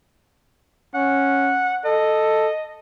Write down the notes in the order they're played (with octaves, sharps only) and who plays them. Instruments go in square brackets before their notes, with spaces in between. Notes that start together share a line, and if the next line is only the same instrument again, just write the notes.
[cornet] C#4 [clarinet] F#5
[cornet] A4 [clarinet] D#5